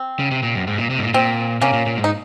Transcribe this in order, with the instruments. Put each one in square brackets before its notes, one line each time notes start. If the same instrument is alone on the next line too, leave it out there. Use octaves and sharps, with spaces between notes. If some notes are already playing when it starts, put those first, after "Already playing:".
Already playing: [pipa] C4
[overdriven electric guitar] C#3
C3
A#2
F#2
G#2
A#2
C3
G#2
A#2
[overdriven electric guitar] A#2 [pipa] C4
[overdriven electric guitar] C3 [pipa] A#3 C#4
[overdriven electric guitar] A#2
A#2
G#2
[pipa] D#4